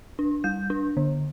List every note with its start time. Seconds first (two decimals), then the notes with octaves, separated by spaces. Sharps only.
0.19 D4
0.44 G3 G6
0.70 D4
0.97 D3